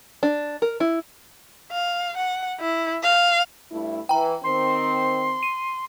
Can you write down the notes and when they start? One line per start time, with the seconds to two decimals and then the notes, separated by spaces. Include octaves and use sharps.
0.23 D4
0.62 A#4
0.80 E4
1.72 F5
2.17 F#5
2.60 E4
3.03 F5
3.71 G2 A3 E4
4.09 E3 G5 A#5
4.44 D#3 C4 C6
5.43 D#7